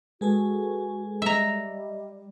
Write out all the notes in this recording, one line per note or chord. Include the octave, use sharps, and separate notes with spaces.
G#3 F#4 G#4 A4 B4 G#5
G3 D#5 E5 A#5